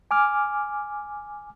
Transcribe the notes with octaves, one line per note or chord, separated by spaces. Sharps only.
G#5 D6 F6